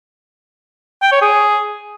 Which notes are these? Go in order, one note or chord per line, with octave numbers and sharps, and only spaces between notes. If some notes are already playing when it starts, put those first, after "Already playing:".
G5
C#5
G#4